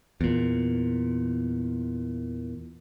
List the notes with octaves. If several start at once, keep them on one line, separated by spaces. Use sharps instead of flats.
E2 A#2